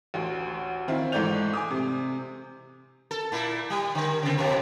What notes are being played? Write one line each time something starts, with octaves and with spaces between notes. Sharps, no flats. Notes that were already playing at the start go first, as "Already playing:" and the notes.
A1 D2
D#3 C4 E4 F4
G#2 E3 A3 D5 G6 F7
G#5 D6 D#6
C3
A4
A#2 E4
G3
D3
C#3 C4
F2 B2 A#4